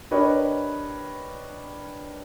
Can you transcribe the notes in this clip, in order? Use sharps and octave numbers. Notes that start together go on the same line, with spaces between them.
D4 G4 A#4 B4 C#5 D#5